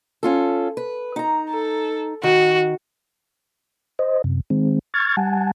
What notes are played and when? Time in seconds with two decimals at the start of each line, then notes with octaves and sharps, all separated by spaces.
0.23 C#4 F4 A4
0.77 B4
1.16 D#4 A#5
1.50 A4
2.23 D#3 F#4
3.99 C5 D#5
4.24 F#2 C3
4.50 D#3 G#3 C4
4.94 C#6 F6 G#6 A6
5.17 G3 F#5 G#5 A5